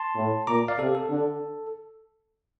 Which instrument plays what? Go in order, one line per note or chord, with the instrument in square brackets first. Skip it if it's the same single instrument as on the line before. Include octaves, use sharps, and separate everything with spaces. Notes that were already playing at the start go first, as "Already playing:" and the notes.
Already playing: [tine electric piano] A5 C6
[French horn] A2
[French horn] A#2 [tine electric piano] A#5 D6
[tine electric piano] D5 F5
[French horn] C3 [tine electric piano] A4
[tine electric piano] A4
[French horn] D3